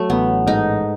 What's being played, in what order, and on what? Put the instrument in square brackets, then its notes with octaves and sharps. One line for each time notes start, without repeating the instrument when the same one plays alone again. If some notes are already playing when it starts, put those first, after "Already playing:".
Already playing: [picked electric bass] F#3 [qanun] A3
[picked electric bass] A1 [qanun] B3
[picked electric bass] G#2 [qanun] D#4